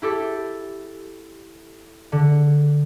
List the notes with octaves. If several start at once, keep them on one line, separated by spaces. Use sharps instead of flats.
E4 G4 A4
D3